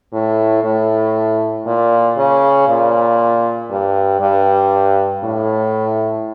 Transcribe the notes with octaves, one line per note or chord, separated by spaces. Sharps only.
A2
A2
A#2
C#3
A#2
G2
G2
A2